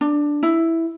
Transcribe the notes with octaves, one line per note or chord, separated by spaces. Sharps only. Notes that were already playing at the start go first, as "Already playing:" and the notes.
D4
E4